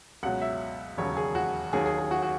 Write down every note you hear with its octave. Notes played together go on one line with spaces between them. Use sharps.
C#2 B2 F#3 F#5
E5
E1 D#2 C#3 F#3 C#5
G#4
F#4
D#2 D#3 F#3 G#4
G#4
G#4
F#4
F#4